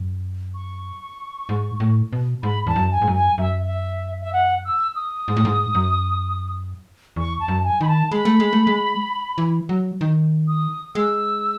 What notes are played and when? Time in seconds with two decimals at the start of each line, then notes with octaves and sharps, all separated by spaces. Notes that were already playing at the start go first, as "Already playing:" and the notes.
Already playing: F#2
0.55 C#6
1.49 G#2
1.80 A2
2.13 B2
2.43 G#2 B5
2.67 E2 A5
2.76 F#2
2.92 G#5
3.02 G#2
3.07 F#2
3.15 G#5
3.38 F#2 E5
3.63 E5
4.21 E5
4.33 F#5
4.65 E6
4.96 D#6
5.28 G#2
5.37 A2
5.45 G#2
5.75 F#2
7.16 E2 C#6
7.40 A5
7.48 F#2
7.64 G#5
7.81 D#3 B5
7.88 A5
8.11 G#3 B5
8.25 A3
8.40 G#3
8.53 A3
8.67 G#3
9.38 E3
9.69 F#3
10.01 D#3
10.48 D#6
10.95 G#3 E6